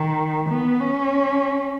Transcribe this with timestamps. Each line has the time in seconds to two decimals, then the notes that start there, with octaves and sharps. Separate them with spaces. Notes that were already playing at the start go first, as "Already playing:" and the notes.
Already playing: D#3
0.50 B3
0.80 C#4